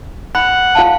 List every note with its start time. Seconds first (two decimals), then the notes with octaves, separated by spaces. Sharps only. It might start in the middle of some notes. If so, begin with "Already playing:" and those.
0.35 F#5 B5
0.75 F4 F5 A5